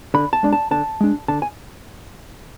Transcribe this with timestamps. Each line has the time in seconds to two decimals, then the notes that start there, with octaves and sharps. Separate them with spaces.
0.14 D3 B5
0.33 A5
0.43 G#3 D4
0.53 A5
0.71 D3 A5
1.01 G#3 D4
1.28 D3 A5
1.42 G#5